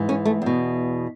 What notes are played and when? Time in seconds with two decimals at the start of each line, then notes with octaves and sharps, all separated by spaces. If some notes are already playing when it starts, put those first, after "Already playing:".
Already playing: G#2 E3
0.09 C#4
0.25 A3
0.42 E2 B2